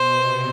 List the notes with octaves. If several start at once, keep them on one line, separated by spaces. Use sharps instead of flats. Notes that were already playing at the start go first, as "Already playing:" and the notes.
Already playing: B2 C5
C3